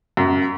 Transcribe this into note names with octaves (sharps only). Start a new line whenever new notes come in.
F#2